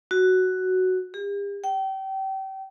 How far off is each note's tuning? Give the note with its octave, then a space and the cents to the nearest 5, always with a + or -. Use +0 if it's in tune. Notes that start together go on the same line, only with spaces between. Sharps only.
F#4 +5
G4 +45
G5 -30